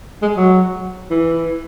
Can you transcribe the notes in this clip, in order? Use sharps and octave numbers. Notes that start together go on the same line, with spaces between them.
G#3
F#3
E3